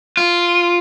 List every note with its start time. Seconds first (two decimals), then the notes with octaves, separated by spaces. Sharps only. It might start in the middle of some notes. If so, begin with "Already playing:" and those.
0.17 F4